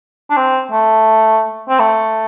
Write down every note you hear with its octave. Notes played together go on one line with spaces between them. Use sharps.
D4
C4
A3
C4
A3